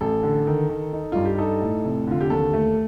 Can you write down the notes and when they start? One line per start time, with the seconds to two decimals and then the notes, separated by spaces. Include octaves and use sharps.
0.01 A1 A4
0.23 D3
0.47 D#3
0.69 D#3
0.93 D#4
1.12 G2 F4
1.25 G4
1.38 D#4 A4
1.62 A2
1.85 F1
2.07 D3 F4
2.20 G4
2.30 D#2 A4
2.53 A3